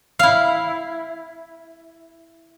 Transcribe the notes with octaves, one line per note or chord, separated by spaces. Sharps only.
E4 F5